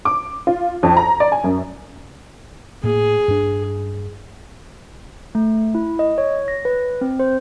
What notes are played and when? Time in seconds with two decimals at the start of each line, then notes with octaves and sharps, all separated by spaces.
0.05 D6
0.47 F4
0.83 F2
0.97 A#5
1.20 D5
1.32 G#5
1.44 F#2
2.84 A2 A#3 G#4
3.28 G2 D4
5.35 A3
5.75 E4
5.99 D#5
6.18 C#5
6.48 A#6
6.65 B4
7.01 C4
7.19 C5